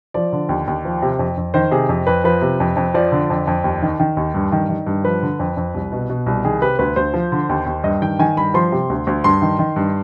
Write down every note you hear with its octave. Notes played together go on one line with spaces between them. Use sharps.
F3 D5
D3
D#2
D#2
F3
C3
F2
F2
D#3 C5
C3 G#4
F2
F2 B4
F3 B4
C3
F2
F2
F3 D5
D3
F2
F2
D#2
D#3
D#3
D#2
G2
D#3
D#3
G2
F3 B4
D3
F2
F2
C2
B2
B2
C2
D#3 G#4
C3 B4
D2 B4
D2 C5
F3
D3
D#2
D#2
G2 D#5
D#3 G5
D#3 G#5
G2 B5
F3 C6
C3
D2
D2
G2 C6
D#3
D#3
G2